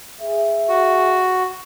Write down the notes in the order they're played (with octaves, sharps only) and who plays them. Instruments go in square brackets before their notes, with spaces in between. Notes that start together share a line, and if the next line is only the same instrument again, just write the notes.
[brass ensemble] G#4 E5
[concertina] F#4